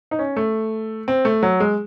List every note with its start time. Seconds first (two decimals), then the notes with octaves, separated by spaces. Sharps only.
0.11 D#4
0.19 C#4
0.36 A3
1.08 C4
1.25 A3
1.43 F#3
1.60 G#3